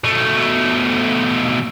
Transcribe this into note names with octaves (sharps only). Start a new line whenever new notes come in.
B2 A3